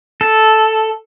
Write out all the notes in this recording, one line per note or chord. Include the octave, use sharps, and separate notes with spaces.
A4